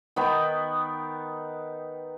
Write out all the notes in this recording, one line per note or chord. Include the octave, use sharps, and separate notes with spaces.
D#3 B3 D#4 G5